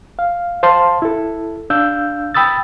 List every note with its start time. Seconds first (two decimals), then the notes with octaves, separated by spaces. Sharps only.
0.19 F5
0.63 C5 F5 A5 C6
1.02 E4 A4
1.70 D4 F5 E6 G6
2.34 G5 B5 D#6 E6 A6